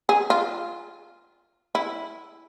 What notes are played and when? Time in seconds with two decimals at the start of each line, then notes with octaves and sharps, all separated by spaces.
0.09 G#4
0.30 F4
1.75 E4